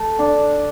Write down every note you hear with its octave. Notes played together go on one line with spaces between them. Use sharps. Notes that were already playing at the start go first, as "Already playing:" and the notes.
Already playing: A3 A4 A5
D4